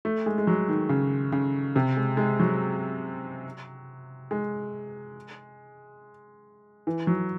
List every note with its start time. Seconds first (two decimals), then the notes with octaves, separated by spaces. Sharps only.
0.05 A3
0.26 G#3
0.38 G#3
0.47 F#3
0.68 D#3
0.89 C#3
1.32 C#3
1.76 C3
1.96 G#3
2.17 G#3
2.40 F#3
4.31 G#3
6.87 E3
7.07 F#3